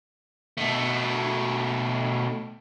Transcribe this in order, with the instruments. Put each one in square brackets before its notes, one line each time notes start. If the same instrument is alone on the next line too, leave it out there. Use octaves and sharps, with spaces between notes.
[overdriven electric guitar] B2 A3